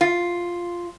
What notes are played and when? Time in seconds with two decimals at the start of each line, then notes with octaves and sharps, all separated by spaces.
0.01 F4